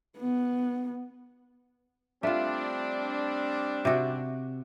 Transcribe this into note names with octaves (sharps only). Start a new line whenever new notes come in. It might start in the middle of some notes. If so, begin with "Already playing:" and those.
B3
G3 A3 C4 D4 F4
C3 F#4